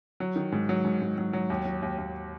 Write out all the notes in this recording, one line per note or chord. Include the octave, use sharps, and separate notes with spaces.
F#3
D#3
G#2
F#3
G#2
G#2
F#3
F#3
D#2
F#3
D#2
D#2